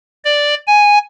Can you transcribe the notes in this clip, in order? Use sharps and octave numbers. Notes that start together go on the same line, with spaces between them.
D5
G#5